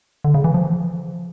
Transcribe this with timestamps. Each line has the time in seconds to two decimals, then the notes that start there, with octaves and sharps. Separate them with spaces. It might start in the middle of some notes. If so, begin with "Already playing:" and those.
0.25 D3
0.34 C#3
0.44 E3
0.54 F3